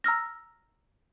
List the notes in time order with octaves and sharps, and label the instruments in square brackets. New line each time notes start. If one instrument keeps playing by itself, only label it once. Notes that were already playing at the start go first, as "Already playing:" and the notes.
[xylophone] A#5 E6 F6 A#6